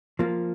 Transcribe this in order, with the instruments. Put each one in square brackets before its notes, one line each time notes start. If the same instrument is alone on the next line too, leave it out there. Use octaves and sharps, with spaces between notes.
[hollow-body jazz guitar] F3 A#3